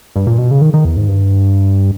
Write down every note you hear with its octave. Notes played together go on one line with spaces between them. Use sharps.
G2
A#2
B2
C#3
D#3
D#3
E2
G#2
G2